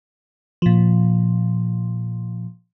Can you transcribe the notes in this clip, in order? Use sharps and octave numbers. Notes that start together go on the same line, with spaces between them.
A#2 F3